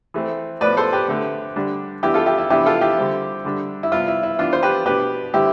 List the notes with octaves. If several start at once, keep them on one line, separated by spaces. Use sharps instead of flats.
E3 A3 C4
A2 F3 B3 B4 D5
A4 C5
G4 B4
D3 A3 C4
D3 G3 D4
E3 B3 D4 E4 G4
F4 A4
E4 G4
E4
C3 E3 B3 D4 E4 G4
F4 A4
E4 G4
D3 G3 C4
D3 G3 D4
E4
C3 G3 B3 F4
E4
E4
E3 B3 D4 F4
C5
G4 B4
B2 B3 D4 G4 B4
D3 G3 C4 E4 G4